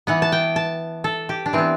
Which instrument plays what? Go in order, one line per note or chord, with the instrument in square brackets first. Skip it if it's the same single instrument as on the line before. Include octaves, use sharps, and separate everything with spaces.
[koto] E3 B3 F#5
A5
G5
A5
A4
G4
D4
E3 B3 C4